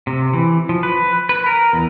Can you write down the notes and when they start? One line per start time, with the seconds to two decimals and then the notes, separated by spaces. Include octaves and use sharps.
0.07 C3
0.33 E3
0.69 F3
0.83 B4
1.29 B4
1.46 A#4
1.73 E2